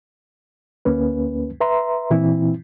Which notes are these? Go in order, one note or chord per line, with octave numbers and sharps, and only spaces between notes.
D2 A#3 C#4 B4
B4 E5 A#5 C6
A#2 E3 C4 E4